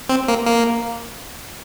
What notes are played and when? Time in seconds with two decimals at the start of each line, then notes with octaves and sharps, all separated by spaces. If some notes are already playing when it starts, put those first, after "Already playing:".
0.10 C4
0.28 A#3
0.46 A#3